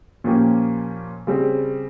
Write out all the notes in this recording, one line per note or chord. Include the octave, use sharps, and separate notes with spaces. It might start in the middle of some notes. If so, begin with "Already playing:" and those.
A#2 F3 A#3 C#4 G4
C#3 G3 C4